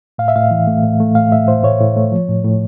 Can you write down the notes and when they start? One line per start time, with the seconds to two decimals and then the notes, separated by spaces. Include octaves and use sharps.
0.18 A2 F5
0.28 E5
0.35 A2 F5
0.51 E3
0.67 A3
0.84 A2
1.00 A3
1.15 A2 F5
1.32 A2 E5
1.48 A2 C5
1.63 A2 C#5
1.80 A2
1.96 A3
2.12 F3
2.29 A2
2.44 A2